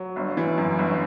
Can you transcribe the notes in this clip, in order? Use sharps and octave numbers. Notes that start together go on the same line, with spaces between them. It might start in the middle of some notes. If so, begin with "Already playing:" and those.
Already playing: F#3
G1
E3
F#2
G1